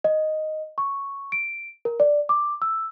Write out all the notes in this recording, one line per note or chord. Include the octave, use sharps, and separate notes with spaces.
D#5
C#6
D7
A#4
D5
D6
E6